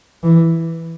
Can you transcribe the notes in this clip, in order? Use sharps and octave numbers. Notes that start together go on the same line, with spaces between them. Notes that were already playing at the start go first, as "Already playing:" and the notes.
E3